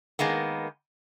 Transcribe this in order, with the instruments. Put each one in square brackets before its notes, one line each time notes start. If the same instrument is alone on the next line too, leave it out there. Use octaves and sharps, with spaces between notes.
[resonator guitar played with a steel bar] D#3 G#3 A#3 B3